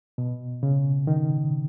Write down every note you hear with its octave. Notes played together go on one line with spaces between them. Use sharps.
B2
C#3
D#3